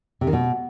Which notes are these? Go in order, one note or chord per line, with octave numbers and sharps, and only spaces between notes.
C3
D#3
B2